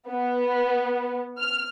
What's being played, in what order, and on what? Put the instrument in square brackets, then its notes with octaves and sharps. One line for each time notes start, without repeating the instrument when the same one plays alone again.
[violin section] B3
F6